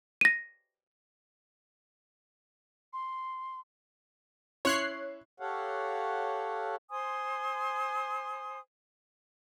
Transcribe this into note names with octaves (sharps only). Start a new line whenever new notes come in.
A#6 D#7
C6
C#4 E4 C#5 C6 F#6 C7
G4 A4 C#5 F5 F#5
C5 G#5 C6 D#6